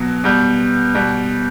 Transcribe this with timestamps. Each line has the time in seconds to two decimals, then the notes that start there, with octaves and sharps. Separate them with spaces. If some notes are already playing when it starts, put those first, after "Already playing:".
Already playing: B2 F#3
0.24 B2 G3
0.95 B2 G3